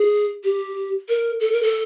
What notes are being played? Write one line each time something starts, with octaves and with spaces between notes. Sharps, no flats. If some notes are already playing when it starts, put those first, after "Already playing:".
Already playing: G#4
G4
A#4
A4
A#4
A4